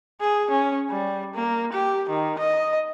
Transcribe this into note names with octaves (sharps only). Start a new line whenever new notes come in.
G#4
C#4
G3
A#3
G4
D#3
D#5